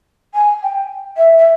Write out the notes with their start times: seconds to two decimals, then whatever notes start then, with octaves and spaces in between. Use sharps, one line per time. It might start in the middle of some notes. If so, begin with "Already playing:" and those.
0.34 G#5
0.62 G5
1.17 E5
1.38 E5